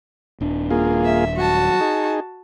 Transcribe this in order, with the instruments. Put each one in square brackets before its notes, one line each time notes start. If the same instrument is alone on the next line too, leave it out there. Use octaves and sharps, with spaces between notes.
[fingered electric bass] D#1 D4
[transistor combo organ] A#3 F4 G#4
[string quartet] E5
[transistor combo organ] F#3 [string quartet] F#4 A5
[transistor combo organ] D#4 G#4